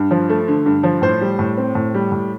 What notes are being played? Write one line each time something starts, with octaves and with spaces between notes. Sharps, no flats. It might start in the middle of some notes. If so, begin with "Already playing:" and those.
Already playing: G2
F3
A3
D3
G2
F3
A2 C5
G3
A2
C4
A2
G3
A2